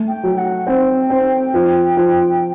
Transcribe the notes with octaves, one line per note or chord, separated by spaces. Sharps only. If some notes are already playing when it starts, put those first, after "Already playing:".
Already playing: A3
G5
F#3
F#5
C4 G5
C4
F3
F3